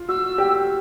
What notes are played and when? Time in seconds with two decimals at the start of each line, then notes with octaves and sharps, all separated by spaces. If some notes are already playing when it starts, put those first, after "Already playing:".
Already playing: F4
0.08 F#4 E6
0.38 G4